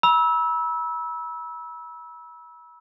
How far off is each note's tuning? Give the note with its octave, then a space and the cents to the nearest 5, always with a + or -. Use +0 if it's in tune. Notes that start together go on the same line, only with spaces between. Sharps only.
B5 -40 E6 -15